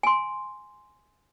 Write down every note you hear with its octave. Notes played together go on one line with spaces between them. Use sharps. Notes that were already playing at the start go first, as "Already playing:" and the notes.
G#5 C6